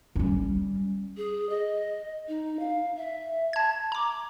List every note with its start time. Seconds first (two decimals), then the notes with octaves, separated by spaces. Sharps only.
0.15 G3 C#4
1.17 G#4
1.49 D#5
2.28 D#4
2.60 F5
2.97 E5
3.53 A5 G#6
3.92 A#5 D6